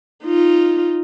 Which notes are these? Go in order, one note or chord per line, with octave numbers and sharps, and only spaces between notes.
D#4 F4